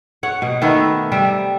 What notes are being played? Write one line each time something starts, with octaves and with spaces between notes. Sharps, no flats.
C#5 F#5
B2
D#3 A3 B3 E4
C3 G3 E5